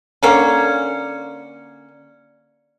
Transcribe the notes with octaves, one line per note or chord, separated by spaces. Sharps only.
D3 A#3 C#4